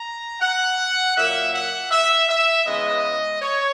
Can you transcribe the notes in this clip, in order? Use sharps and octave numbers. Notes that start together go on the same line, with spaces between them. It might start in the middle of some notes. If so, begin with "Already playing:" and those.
Already playing: A#5
F#5
A#2 F#3 A#3 E5
F#5
E5
E5
C#3 E3 G#3 B3 D#5
C#5